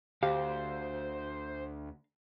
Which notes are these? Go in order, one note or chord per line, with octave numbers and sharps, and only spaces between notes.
D2 G4 C5 F5